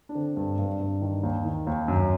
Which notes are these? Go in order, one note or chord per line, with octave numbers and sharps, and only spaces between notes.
D4
D3 C4
G2
G2
G2
D#3
D#2
D#3
D#2
F#2